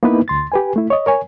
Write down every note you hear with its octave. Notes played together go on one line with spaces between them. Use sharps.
A#3 B3 D#4 E4 B4
D2 C6 A6
G4 B4 G#5
A3 E4
C#5 D#5
A#4 C#5 G#5